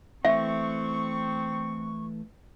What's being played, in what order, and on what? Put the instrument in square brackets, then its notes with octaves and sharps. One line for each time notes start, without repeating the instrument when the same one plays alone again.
[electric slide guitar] E3 A3 [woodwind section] C4 C#6 [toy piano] E5